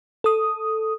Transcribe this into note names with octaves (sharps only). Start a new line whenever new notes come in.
A4 D#6